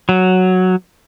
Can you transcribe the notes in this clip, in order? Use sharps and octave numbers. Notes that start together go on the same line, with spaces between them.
F#3